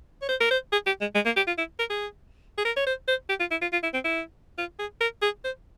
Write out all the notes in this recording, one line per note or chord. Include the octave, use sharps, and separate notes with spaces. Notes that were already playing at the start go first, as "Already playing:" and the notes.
C#5
C5
A#4
C5
G#4
G4
G#3
G#3
A#3
G4
F4
E4
A#4
G#4
G#4
A#4
C#5
C5
C5
G4
F4
E4
F4
F4
E4
C4
E4
F4
G#4
A#4
G#4
C5